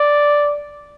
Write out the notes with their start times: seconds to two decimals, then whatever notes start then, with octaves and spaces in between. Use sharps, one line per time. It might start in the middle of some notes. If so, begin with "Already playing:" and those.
Already playing: D5